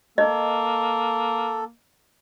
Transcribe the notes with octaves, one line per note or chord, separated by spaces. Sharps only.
A#3 A4 D#5